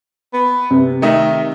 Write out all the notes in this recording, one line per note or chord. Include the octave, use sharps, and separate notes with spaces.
B3
C3
D#3 A3 D#4 E5